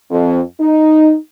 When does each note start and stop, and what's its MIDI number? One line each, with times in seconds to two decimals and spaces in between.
0.11 0.41 41
0.60 1.16 63